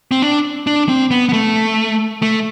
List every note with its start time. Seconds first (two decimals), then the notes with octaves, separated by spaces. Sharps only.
0.11 C4
0.22 D4
0.67 D4
0.89 C4
1.11 B3
1.29 B3
1.33 A3
2.22 A3